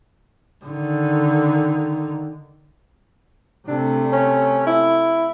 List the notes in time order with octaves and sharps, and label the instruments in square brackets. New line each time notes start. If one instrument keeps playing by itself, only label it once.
[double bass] D3 D#3
[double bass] C3 A3 [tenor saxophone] D4
[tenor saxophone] C#4
E4